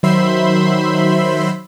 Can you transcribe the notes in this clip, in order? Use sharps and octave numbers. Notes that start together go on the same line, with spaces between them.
D#3 F#3 C5 E5 B5 C6